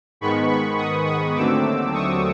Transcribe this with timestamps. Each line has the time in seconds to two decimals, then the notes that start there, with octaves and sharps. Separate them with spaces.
0.21 G#2 D#3 G#3 B3 B5 C#6
0.50 B5 C#6
0.78 C#6 D#6
1.07 C#6 D#6
1.35 D#2 D3 F#3 A3 C4 D6 E6
1.94 C#6 D#6